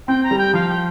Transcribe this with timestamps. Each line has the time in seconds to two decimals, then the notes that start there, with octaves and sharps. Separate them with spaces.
0.07 C4 G5
0.23 A#5
0.31 G3
0.38 G5
0.54 F3 F5
0.68 G5